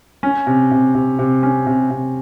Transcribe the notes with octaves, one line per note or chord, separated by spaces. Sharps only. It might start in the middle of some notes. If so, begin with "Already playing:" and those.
C#4
C3
C3
C3
C3
C#4
C3
C3